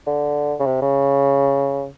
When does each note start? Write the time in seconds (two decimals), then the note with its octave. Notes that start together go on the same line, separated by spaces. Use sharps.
0.06 D3
0.60 C#3
0.66 C3
0.82 C#3